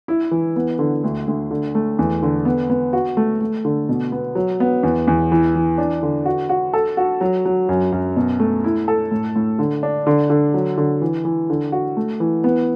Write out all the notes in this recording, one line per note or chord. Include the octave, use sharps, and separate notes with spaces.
E4
E3
B3
D3
D2
D2
D3
A3
E2
D3
B3
B3
F#4
A3
A3
D3
B2
B3
F#3
B3
E2
E2
E3
E3
D4
D3
F#4
F#4
A4
F#4
F#3
F#3
F#2
F#2
B2
A3
E4
A4
A2
A2
D3
D4
D3
D3
F#3
D3
E3
E3
D3
F#4
A3
E3
B3